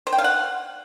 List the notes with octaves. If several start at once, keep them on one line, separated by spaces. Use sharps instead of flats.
C5
G5
F5
F#5